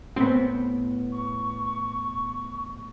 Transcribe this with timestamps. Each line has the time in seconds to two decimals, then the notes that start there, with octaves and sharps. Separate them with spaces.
0.16 A2 B3 C4
1.12 C#6